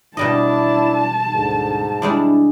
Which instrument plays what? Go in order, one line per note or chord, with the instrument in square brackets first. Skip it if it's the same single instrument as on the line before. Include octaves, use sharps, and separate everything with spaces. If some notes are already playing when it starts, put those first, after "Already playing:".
[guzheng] B2 G3 D#5 [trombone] D4 [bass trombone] E4 [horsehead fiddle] A5
[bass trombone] D2 [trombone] G#2
[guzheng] G3 G#3 D4 [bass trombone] E4